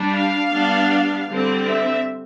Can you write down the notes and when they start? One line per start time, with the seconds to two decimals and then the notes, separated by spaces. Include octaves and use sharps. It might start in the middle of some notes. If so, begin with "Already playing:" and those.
Already playing: G3 D4
0.14 F5
0.53 G3 B3 D4
1.29 D3 G3 C4
1.67 E5